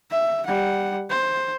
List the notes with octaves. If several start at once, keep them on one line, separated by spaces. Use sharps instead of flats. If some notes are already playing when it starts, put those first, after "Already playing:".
E5
G3 F#5
C5